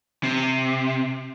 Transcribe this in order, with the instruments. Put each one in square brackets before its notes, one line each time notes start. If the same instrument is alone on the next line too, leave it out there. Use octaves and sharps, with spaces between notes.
[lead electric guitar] C3